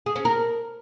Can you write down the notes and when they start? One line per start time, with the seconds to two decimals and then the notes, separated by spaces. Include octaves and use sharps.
0.06 G#4
0.16 C#4
0.25 A#4